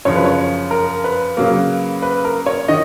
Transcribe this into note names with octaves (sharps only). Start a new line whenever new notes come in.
F#2 C#3 F3 C#5
B4
C#5
A#4
B4
C#3 F#3 A#3
B4
A#4
C#5
D#3 D#5